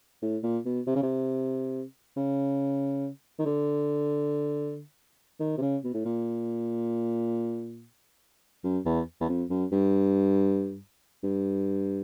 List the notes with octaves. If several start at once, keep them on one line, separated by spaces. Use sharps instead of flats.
A2
A#2
B2
C3
C#3
C3
C#3
D#3
D3
D#3
C3
C#3
B2
A2
A#2
F#2
E2
E2
F2
F#2
G2
G2